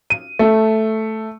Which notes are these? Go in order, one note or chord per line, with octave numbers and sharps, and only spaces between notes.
D#7
A3